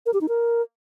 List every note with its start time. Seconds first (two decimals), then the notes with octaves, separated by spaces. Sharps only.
0.06 A#4
0.14 G4
0.21 D#4
0.29 A#4